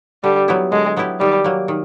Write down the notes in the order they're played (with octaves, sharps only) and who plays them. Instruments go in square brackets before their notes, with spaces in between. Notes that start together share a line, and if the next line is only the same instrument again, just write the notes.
[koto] D3 [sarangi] G3
[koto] F#3 B3 E4 G4
[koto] D3 [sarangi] G#3
[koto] F#3 B3 E4 G4
[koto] D#3 [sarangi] G3
[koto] F#3 A#3
D#3